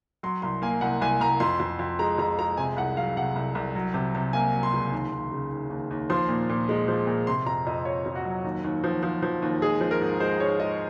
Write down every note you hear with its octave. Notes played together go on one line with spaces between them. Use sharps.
F#3 C6
C2 C6
A#3 G#5
C2 F#5
C2 G#5
C2 A#5
F2 C6
F2
F2
G#3 A#5
F2 A#5
G#3 A#5
C3 G#5
C2 F#5
F#3 F5
C3 F#5
C2
C2
F#3
C3
C3
A#3 G#5
F#3
C6
C#2
D#2
D#2
C#3
D#2
D#2
D#2
F3 C6
A#2
A#2
G#3
F3
A#2
C3 C6
F2 A#5
F2 D#5
F2 C#5
F2
F#4
F#3
D#2
D#2
F3
F3
F3
D#2
G#3 G#4
F3
A#4
G#2
G#3 C5
G#2 C#5
G#3 D#5